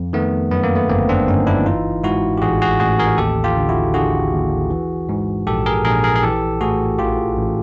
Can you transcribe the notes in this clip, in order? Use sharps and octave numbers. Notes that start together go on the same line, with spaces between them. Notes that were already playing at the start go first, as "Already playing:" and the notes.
Already playing: F2
D#3 A3 B3
F#2 B3
A#3
A3 B3
G1 A#3 C4
C4 D4
G1 C#4 D#4
D4 E4
E3 D#4 F4
G#2 E4 F#4
G4
A1 F#4 G#4
F#4 G#4
A1 F#4 G#4
G#4 A#4
D#2 G4 A4
F4 G4
D3
E4 F#4
D3 F#4 G#4
D#2
E3
G#2
A#1 G4 A4
G#4 A#4
A#1 G#4 A#4
G#4 A#4
G#4
E3 G4 A4
A2 F#4 G#4
A1 F4 G4
A1